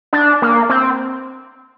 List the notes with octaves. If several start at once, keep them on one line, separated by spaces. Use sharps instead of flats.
D4
A#3
C4